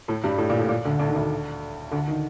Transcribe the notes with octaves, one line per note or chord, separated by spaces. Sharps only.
A2 A3
G2 G3
A2
A#2
A2
A#2
D2 D3
D2 D3
D#3
D2 D3
D2 D3
D#3